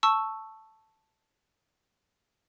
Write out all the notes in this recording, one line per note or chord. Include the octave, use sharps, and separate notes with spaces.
A5 C#6 E6